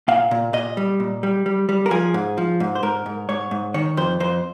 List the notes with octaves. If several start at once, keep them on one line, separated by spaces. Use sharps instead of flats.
A#2 F5
A#2
A#2 D#5
G3
A#2
G3
G3
G3
A#4
F3 G#4
G#2
F3
G#2
C5
G#2 A#4
G#2
G#2 C#5
G#2
D#3 C#5
F2 C5
F2 C5